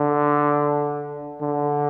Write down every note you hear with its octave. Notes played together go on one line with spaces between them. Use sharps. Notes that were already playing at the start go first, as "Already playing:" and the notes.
Already playing: D3
D3